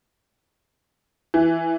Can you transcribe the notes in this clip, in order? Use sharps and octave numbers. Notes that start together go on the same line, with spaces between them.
E3